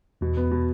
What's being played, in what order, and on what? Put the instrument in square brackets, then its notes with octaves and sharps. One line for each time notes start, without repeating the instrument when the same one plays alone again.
[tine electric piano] E2 [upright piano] B2
[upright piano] B3
B2